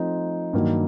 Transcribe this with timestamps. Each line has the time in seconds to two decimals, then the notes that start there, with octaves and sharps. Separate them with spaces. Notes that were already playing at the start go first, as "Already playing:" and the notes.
Already playing: F3 A3 C4 D#4
0.53 G2 D#3 F#3 A#3